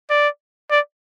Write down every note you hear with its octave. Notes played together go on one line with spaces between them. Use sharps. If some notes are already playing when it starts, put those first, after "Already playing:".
D5
D5